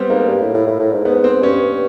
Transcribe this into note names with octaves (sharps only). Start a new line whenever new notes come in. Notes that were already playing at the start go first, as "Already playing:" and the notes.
Already playing: G3 B3 C4
G#2 A#3
G2
A2
A2
A2
A2
G#2
G#2 B3
C4
G2 C#4